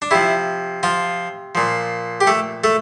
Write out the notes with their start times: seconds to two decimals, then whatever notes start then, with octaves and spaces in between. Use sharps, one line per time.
0.02 D4
0.11 C3 F3 E4
0.83 F3 F4
1.55 A#2 F3
2.21 G4
2.27 A3 A4
2.64 A3 A4